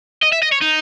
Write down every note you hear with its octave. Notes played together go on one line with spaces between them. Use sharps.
D#5
E5
D#5
C#5
D#4